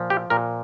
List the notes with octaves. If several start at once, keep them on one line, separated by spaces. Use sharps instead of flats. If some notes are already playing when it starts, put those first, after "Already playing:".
Already playing: A#2 F3
G4
A#2 A#4